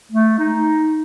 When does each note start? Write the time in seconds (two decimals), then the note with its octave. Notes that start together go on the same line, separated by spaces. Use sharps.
0.12 A3
0.39 D#4